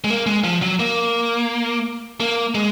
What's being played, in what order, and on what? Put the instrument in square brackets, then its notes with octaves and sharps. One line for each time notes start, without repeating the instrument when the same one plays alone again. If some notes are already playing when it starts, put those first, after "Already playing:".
[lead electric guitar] G#3
A#3
G#3
F3
F#3
A#3
A#3
G#3